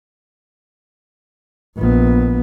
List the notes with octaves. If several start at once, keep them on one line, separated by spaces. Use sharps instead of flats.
A#1 B3